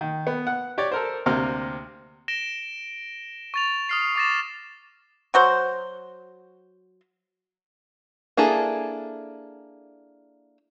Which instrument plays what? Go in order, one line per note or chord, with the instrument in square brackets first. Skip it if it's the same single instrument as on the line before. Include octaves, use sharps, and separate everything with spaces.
[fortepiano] D#3
B3
F#5
G4 C#5 D5
A4 A#4 C5
D2 C3 A#3 C4 F6
[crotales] A#6 D7 E7 G7
C#6 A6 F7
D#6 F6 C7
C#6 D6 A6 A#6 E7
[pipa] F#3 F#4 C5
[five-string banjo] A#3 D4 E4 G#4 A4